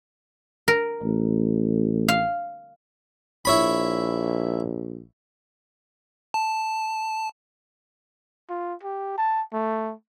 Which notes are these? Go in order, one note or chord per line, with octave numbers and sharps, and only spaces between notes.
A#4
A1
F5
A#1 E4 C#5 B5
A5
F4
G4
A5
A3